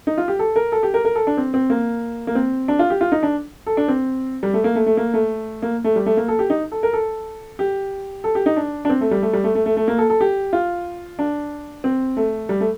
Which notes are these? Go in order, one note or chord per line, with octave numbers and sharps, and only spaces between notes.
D#4
F4
G4
A4
A#4
A4
G4
A#4
A#4
A4
D4
C4
C4
A#3
A#3
C4
D4
F4
G4
F4
D#4
D4
A4
D4
C4
G3
A3
A#3
A3
A3
A#3
A3
A#3
A3
G3
A3
A#3
A4
G4
D#4
A4
A#4
A4
G4
A4
G4
D#4
D4
D4
C4
A3
G3
A3
G3
A3
A3
A3
A3
A#3
A4
A4
G4
F4
D4
C4
A3
G3
A3